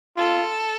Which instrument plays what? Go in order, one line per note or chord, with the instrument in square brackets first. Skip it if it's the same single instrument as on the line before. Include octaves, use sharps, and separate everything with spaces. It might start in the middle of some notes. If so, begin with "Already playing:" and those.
[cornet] F4 [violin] A4